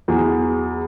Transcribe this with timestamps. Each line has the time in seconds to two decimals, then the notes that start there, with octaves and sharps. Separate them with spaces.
0.08 E2 F#3 G#4 A#5